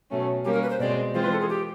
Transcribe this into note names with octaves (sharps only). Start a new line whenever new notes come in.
B2 F#3 A3 C#4
G3 A#3 C#4 G4
A#4
B4
C5
B2 G#3 C4 D5
E3 G#3 C4 F4 C5
B4
A4
G#4
G4